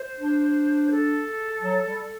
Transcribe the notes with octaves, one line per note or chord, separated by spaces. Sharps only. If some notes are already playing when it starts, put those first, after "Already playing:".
Already playing: C5
D4
A4
F#3
G3